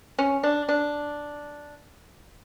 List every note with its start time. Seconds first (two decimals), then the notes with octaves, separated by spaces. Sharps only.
0.19 C#4
0.43 D4
0.69 D4